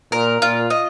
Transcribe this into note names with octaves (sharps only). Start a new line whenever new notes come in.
A#2 A#4
A#2 F4
D#5